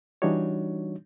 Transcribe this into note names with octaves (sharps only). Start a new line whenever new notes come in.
E3 G3 D4 D#4 F#4 C#5